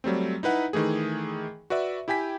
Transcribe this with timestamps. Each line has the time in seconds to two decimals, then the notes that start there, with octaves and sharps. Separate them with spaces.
0.04 F#3 G3 A3 C4
0.43 D#4 E4 B4 F#5
0.73 D#3 E3 A3 G#4
1.70 F#4 B4 D5 E5
2.08 E4 G4 G5 G#5 B6